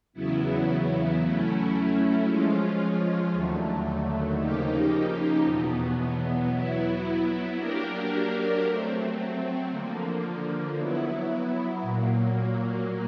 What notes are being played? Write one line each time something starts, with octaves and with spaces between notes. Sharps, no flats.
E2 C#3 F#3 B3 E4
F#3 A3 C#4 E4
F3 G#3 C#4 F4
D#2 D3 F#3 A3
C#3 F3 A#3 D#4 G4
E2 B2 F#3 B3
F#3 B3 E4
F#3 A#3 D4 G4 A#4
F#3 A3 C4
D3 F3 A#3
F#3 B3 E4
A#2 F#3 A#3